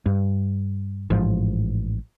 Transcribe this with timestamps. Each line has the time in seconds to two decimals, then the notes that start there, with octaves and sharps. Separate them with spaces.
0.06 G2
1.10 A1 G#2 F3